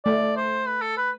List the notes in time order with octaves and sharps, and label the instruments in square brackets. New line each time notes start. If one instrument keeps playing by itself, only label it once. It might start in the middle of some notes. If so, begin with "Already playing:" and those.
[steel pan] A3 [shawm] D5
[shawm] C5
B4
A4
B4